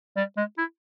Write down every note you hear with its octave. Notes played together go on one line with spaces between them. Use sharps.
G3
G#3
E4